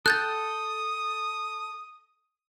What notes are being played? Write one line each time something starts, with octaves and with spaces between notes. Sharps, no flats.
A4 G5 D#6 F#6 G6 A6